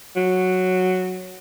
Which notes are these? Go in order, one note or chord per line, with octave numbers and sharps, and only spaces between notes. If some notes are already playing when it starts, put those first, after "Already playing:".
F#3